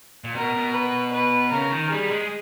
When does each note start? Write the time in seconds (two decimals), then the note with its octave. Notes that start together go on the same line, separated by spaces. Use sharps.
0.24 A#2
0.35 B2 A#4
0.55 B2
0.74 B4
1.13 B4
1.52 C#3 A#4
1.72 D#3
1.91 G3 G#4
2.11 G#3